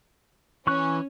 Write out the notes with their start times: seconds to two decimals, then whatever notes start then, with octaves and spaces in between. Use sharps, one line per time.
0.67 E3 C#4 C#6 F#6